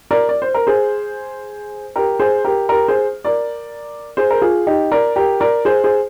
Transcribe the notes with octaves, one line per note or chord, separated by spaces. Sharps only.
A#4 D5
D5
C5
A#4
G#4 C5
G4 A#4
G#4 C5
G4 A#4
G4 A#4
G#4 C5
A#4 D5
G#4 C5
A#4
F4 G#4
D#4 G4
A#4 D5
G4 A#4
A#4 D5
G#4 C5
G#4 C5